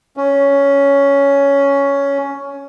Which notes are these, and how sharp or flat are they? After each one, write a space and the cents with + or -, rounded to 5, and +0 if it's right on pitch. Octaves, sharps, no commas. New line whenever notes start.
C#4 +10